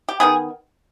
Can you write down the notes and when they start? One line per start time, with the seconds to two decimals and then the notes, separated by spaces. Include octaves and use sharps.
0.09 G4
0.20 D#3 F#3 B3 G#4